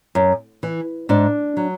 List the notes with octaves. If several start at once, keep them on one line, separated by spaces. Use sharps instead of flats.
F#2
E3
G#2 D4
F#3